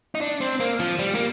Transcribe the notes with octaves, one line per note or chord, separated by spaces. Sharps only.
D#4
D4
C4
A#3
F3
G3
A#3